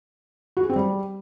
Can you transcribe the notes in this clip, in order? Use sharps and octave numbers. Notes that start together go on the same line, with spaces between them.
F#4
G#4
C4
G3